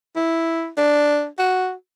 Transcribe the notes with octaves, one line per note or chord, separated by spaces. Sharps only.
E4
D4
F#4